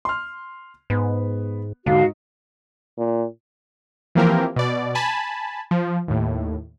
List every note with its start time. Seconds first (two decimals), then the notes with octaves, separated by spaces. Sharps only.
0.05 C6 F6
0.90 G#2 B3
1.86 G#2 D3 F#4 F5
2.98 A#2
4.15 E3 F3 A#3 C4 G4 A#4
4.56 B2 D5
4.95 G#5 A5 B5
5.71 F3
6.08 D#2 A2